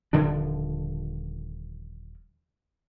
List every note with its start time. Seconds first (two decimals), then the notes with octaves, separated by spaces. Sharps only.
0.13 D#1 D3 F3 D4